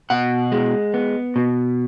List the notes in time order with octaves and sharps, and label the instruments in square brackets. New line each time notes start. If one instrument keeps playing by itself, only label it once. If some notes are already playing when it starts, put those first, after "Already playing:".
[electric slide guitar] B2 F#5
G#3
B3
B2